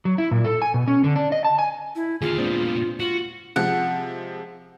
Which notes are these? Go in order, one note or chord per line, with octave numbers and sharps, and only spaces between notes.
F#3
E4
A#2
A4
G#5
B2
C#4
D3
D4
D#5
A5
G#5
E4
D#2 D3 F4 G#4 F5
A#2 G#3 B3 C4 D4
F4 F#4
C3 F3 G#3 F#5